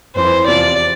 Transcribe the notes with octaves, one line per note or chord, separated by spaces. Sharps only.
F2 E3 C5
E2 C3 F3 D5